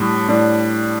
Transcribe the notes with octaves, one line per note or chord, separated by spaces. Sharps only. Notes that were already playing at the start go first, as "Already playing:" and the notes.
Already playing: A2 G3 D4
A2 G3 D4